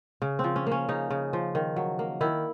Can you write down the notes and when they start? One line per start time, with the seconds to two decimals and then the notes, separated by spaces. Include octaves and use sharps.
0.22 C#3
0.39 F3 C4
0.56 C#4
0.66 A#3
0.72 C#4
0.89 C#3 D#4
1.10 C#3
1.33 F3
1.55 D#3
1.76 F#3
1.99 A#3
2.21 D#3 E4